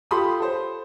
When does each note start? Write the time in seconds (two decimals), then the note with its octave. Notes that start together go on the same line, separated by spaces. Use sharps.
0.11 F4 G4 A4 B5 C6 D#6
0.40 A4 C5